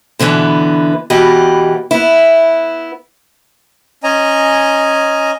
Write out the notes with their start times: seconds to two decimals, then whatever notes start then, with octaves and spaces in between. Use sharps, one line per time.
0.19 B2 D3 E3 B3
1.10 E2 B2 E3 G4 D#5
1.91 B3 E4
4.04 C#4 D#5 G#5 A#5